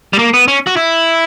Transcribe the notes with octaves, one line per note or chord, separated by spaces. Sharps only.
G3
A#3
B3
C#4
F#4
E4